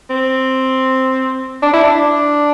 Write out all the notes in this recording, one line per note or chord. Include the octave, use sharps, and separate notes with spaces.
C4
D4
E4
D4